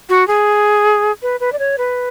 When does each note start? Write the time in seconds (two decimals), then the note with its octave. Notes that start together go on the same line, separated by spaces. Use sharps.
0.09 F#4
0.27 G#4
1.22 B4
1.40 B4
1.52 D5
1.59 C#5
1.78 B4